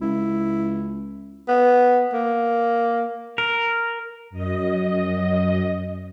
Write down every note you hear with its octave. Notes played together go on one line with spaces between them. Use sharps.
C#2 E4
B3
A#3
A#4
F#2 D#5